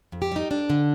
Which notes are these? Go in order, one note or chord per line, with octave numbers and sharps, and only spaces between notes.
F2
G4
G3 D#4
F2 D4
D3